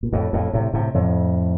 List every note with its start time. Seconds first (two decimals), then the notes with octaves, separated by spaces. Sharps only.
0.03 A#2
0.13 F2 A2
0.33 F2 A2
0.53 A2 C3
0.73 A2 C3
0.94 F2 A2